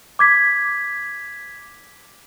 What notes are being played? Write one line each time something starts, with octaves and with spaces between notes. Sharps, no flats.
D6 G#6 B6